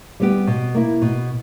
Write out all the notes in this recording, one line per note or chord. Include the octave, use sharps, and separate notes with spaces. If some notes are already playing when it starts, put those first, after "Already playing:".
G3 B3 G4
B2
A#3 E4
B2